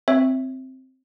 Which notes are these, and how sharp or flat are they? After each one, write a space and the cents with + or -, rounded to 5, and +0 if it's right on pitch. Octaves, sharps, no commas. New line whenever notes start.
C4 +0 C#5 +0 E5 +0